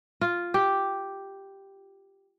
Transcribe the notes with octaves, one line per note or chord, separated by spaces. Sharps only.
F4
G4